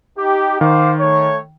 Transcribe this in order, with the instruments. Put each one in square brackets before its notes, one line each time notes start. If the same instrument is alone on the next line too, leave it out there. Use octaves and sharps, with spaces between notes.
[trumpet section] D#4 G4
[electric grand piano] D#3 [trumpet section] C5 F5 D6
[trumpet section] A3 C#5